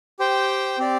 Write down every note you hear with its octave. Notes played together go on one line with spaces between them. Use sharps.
G4 C5 G5
C4 G4 D5